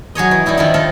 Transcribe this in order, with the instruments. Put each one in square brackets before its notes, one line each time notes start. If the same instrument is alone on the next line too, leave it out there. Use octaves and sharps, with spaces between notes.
[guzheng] F#3 G#4 C#5 D#5
E3
G3 D#4 E4 G4
D#3 F3 D#4
F3 F4 A4